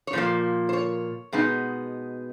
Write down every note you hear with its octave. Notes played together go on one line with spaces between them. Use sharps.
C#5
A#2 F3 A#3 C5
C5
C#5
B2 G#3 B3 D#4